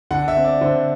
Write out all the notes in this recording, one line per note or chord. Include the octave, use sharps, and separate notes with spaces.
D3 F#5
E5
C4
D5
D3 C5